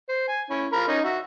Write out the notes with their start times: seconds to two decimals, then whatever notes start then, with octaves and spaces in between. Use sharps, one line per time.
0.09 C5
0.28 G#5
0.50 C#4 E4
0.72 F4 A#4 B5
0.88 C#4 D#4
1.04 F#4 E5